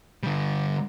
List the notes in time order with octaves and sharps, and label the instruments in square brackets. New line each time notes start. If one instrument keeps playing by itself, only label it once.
[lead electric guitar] D3 G3